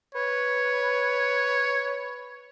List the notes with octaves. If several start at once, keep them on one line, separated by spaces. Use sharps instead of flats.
B4 C#5